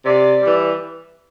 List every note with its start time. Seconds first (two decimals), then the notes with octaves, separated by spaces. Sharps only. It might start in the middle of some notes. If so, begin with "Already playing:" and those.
0.05 C3 D5
0.42 E3 G3